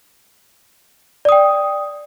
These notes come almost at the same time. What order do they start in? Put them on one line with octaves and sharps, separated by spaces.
D5 D#6 G5